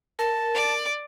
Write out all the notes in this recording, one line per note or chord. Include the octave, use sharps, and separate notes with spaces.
A#4 A5
D5